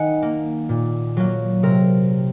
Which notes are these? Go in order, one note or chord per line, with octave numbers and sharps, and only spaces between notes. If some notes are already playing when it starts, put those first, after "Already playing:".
Already playing: D#3 F#5 G#5
A#3
A#2
F#3 A#3
C3 A#4